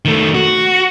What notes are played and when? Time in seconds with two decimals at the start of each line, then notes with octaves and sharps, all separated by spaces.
0.05 D#3 A3
0.35 F#4